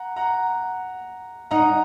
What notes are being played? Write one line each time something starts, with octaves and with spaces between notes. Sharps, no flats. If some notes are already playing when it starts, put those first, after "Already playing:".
Already playing: F#5 A#5
F#5 A#5
D#4 F#5 A#5